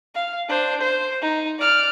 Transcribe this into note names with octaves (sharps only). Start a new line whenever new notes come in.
F5
D4 C5
C5
D#4
D5 F6